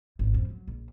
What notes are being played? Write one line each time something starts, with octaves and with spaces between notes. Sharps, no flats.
G#1
F2 A#2
F#3
A#1